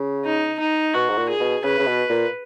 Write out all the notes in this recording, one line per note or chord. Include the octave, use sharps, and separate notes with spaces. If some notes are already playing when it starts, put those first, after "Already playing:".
Already playing: C#3
D#4
D#4
B2 F#4
G#2
A#2
G#4
B2
C#3 B4
C#3
B2
A#2